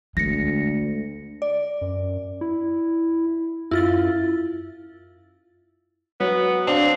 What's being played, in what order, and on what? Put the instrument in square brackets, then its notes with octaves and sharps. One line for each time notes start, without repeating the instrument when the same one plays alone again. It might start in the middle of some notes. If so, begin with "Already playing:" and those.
[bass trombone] D2 [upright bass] G#3 [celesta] A#6 C#7
[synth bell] D5
[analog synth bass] F#2
E4
[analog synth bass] F#2 [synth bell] E4 F4 A6
[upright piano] F#3 [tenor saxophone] B3
[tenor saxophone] C4 [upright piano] D4 F5